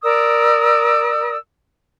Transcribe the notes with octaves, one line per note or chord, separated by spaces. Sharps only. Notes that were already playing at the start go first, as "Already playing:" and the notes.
A#4 D5 D#6 E6